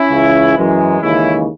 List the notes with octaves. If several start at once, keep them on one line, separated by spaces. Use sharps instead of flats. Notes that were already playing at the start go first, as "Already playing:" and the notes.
Already playing: C#4 E4
C#2 C#3 E3
F#2 E3 G#3
D#2 C#3 E3 G#3 C#4 E4